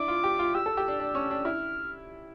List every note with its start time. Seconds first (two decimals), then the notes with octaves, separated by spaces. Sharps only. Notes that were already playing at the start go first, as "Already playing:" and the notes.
Already playing: D4 E4 D6
0.08 F4
0.24 G4
0.39 F4
0.54 G4 E6
0.66 A4
0.77 G4
0.88 D4
1.00 D4
1.15 C#4
1.31 D4
1.45 E4 F6